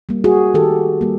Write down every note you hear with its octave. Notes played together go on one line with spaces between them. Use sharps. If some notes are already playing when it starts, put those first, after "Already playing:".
G3 A#3
F#4 G#4
D#3 G4 A4
G3 A#3